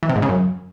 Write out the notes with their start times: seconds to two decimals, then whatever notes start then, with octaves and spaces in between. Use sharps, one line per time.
0.03 E3
0.09 C3
0.16 G#2
0.22 C#3
0.29 F#2